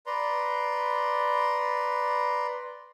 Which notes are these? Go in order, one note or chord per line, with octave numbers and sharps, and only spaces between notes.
B4 D5 A#5 C6